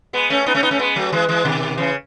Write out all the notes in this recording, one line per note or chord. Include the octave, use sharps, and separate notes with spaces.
G#3 B3
A3 C#4
B3 D#4
A3 C#4
B3 D#4
A3 C#4
G#3 B3
F#3 A3
E3 G#3
E3 G#3
B2 D#3
C#3 E3